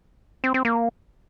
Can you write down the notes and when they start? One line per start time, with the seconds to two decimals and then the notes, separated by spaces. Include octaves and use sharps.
0.44 C4
0.54 C4
0.65 A#3